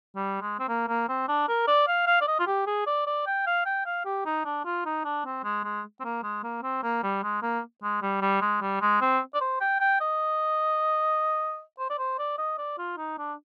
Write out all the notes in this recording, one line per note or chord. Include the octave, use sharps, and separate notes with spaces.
G3
G#3
C4
A#3
A#3
C4
D4
A#4
D5
F5
F5
D5
D#5
F4
G4
G#4
D5
D5
G5
F5
G5
F5
G4
D#4
D4
F4
D#4
D4
C4
G#3
G#3
C4
A#3
G#3
A#3
C4
A#3
G3
G#3
A#3
G#3
G3
G3
G#3
G3
G#3
C4
D5
C5
G5
G5
D#5
C5
D5
C5
D5
D#5
D5
F4
D#4
D4